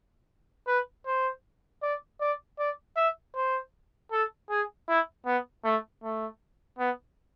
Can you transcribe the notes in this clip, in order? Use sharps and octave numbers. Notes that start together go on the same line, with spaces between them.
B4
C5
D5
D5
D5
E5
C5
A4
G#4
E4
B3
A3
A3
B3